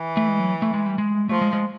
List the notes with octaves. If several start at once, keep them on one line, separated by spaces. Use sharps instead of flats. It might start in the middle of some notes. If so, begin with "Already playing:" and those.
Already playing: E3
A3
G#3
F#3
A3
G#3
G3
G#3
F3 A3
G#3
G#3